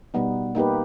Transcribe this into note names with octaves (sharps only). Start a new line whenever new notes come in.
B2 G3 B3 D#4
A#3 D#4 G4 B4